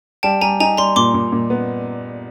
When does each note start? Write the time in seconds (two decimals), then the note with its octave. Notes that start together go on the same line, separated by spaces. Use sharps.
0.23 G3 G5 A5
0.41 G3 G#5 A#5
0.60 D#4 G#5 A#5
0.77 G3 A#5 C6
0.96 A#2 C6 D6
1.14 A#2
1.32 A#2
1.50 B3